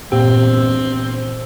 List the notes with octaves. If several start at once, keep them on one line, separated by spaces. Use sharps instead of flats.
A#1 E2 G2 A#2 C4 G4